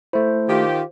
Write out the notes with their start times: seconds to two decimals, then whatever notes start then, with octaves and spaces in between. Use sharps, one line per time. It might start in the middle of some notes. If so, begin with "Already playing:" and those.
0.13 A3 E4 C5
0.49 D#3 F4 G4